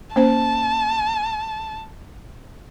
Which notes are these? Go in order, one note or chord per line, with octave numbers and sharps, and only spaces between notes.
A#3 C#4 C5 A5